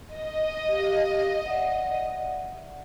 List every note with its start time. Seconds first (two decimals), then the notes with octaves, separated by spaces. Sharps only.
0.12 D#5
0.69 G4 F5
1.46 D5 E5 F#5